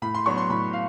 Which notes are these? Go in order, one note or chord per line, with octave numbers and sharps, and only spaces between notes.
A2 B5
C6
F#3 B3 D4 C#6
C6
A2 B5
F5